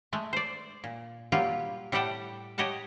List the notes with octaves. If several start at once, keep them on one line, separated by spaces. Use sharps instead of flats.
G#3 A3
C5 D5
A#2
F#3 G3 A#3 F4 G4
A2 G3 G4 F#5 G5 A5
G4 C#5 D#5 F#5 A5